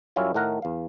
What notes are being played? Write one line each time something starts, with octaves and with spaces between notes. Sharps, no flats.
F#2 G3 C#4 E4 F4 C#5
A2 D#3 A3 A#4 F#5 A#5
E2 F5